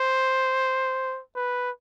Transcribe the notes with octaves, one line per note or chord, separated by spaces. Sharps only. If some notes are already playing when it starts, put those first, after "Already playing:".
Already playing: C5
B4